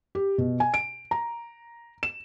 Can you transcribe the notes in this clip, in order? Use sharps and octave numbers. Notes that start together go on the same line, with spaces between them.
G4
B2
G#5
D7
A#5
E7